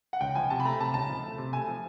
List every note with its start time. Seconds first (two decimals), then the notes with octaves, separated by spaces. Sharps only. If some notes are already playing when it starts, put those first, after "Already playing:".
0.13 F#5
0.21 C#2 G5
0.35 F3 G#5
0.50 C3 A5
0.60 B5
0.65 A3 A#5
0.80 C3 A5
0.94 C#2 A5
1.09 F3
1.23 A3
1.38 C3
1.53 A3 G#5
1.68 F3